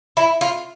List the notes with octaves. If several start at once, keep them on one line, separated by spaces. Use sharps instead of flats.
E4
F4